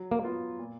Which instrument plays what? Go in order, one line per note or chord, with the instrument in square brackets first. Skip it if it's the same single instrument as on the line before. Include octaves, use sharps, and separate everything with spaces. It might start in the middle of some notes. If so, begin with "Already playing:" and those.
Already playing: [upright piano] F#3
[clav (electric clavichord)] A#3
[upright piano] B3 F4
A#2